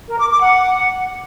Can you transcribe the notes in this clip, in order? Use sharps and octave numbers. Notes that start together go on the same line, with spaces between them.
A#4
D6
D6
F#5